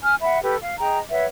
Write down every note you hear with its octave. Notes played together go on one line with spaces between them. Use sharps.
G#5 F6
E5 F#5 B5
G4 A4 B4
F5
G#4 D#5 G5 A#5
B4 C#5 E5 F#5